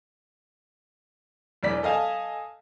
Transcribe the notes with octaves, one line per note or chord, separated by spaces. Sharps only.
E1 E2 D5 B6
A4 D#5 F5 G#5 A5